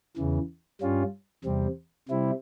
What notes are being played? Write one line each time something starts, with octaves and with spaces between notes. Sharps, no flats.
E2 C#3 E3
G2 G3 C#4 F4
E2 C3 G3 C4
C3 G3 C4 E4